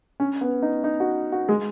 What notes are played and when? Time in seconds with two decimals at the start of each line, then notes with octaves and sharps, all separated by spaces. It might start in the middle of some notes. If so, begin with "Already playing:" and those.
0.20 C#4
0.41 B3
0.62 D#4
0.84 D#4
1.00 F#4
1.32 F#4
1.49 G#3